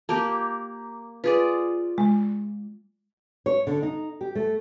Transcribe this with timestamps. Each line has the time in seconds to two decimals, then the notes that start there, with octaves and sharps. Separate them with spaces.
0.09 A#3 G4 A#4 A5
1.24 F4 G#4 B4 D5
1.98 G#3
3.46 C#5
3.67 D3
3.82 D#4
4.21 G4
4.35 A3